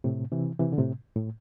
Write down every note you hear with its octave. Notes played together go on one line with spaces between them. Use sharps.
A2 C3
C3 E3
C3 E3
D3
A2 C3
A2